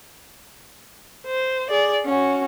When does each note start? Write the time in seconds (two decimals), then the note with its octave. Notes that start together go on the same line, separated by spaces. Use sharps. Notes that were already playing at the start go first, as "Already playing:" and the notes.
1.26 C5
1.70 G#4 D5
2.05 C#4 F#4